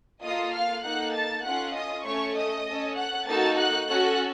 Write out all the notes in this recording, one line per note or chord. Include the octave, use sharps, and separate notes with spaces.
A#3 F4 A4 D#5 D#6
F5 F6
A#3 D#4 A4 F#5 F#6
A5 A6
C#4 F4 A4 F#5 F#6
D#5 D#6
A3 C#4 A4 C#5 C#6
D#5 D#6
C#4 A4
F#5 F#6
A#3 D#4 F#4 A4 A5 A6
F#5 F#6
C#4 F#4 A4 F#5 F#6